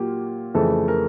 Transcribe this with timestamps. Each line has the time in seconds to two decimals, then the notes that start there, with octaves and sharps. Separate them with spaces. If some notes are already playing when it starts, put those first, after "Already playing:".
Already playing: A#2 F#3 A#3 F4 G4
0.54 F2 C#3 E3 A3 A4
0.88 A#4